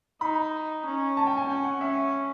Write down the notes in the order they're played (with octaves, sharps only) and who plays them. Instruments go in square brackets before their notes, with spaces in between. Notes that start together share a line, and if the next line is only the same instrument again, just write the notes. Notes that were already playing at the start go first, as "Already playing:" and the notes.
[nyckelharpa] D#4 [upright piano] B5
[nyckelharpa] C#4
[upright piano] A5
G5
G#5
[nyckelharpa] C#4 [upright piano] G5
[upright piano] F#5
[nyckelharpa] C#4 [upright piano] E5